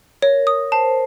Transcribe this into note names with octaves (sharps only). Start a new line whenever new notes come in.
A#4 C#5
D#6
C5 A5